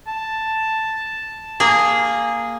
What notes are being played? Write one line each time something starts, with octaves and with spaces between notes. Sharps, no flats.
A5
A#3 G#4